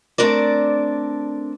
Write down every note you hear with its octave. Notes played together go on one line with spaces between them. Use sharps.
A3 C4 D4 A#4 D5